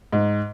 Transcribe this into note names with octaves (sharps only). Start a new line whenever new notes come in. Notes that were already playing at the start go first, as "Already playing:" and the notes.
G#2